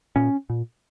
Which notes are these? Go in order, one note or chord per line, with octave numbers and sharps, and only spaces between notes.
A#2 C#4
A#2